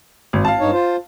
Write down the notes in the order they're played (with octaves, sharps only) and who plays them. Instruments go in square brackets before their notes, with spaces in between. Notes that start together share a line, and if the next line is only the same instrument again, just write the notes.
[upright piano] G#1
F5 A5
[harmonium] G2 D#4 C#5
F4 C5